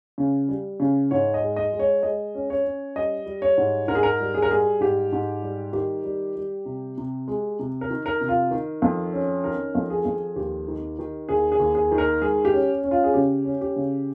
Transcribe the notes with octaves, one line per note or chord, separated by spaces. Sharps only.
C#3
G3
C#3
G#2 C#5
D#5
G#3
D#5
G#3
C#5
G#3 D#5
C#4
C#5
C#4
G3 D#5
G3
C#5
G#2
G#2 A#4
G#4
A#4
G3
G#4
A#4
G3 G#4
G#2 G4
G#2
G3
D#3 G4
G3
G3
C3
C3
G#3
C3
A#4
D#3
A#4
C3
F4
D#3
F2
C#4
D#3 A#4
F2
G#4
F2
D#2 G4
D#3
D#3
D#2 G#4
G#4
D#2
G#4
D#3
A#4
G#3 G#4
G4
C#4
C#4
F4
G#4
C#3 G4
C#4
G4
C#3